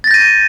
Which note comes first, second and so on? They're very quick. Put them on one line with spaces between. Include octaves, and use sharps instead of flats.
A6 A#6 G6 D#7